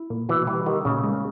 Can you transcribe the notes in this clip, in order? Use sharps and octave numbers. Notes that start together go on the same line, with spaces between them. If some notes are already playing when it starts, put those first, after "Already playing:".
Already playing: E4
A#2
B2 E3
E3 G3
D#3 G3
A#2 C#3
G#3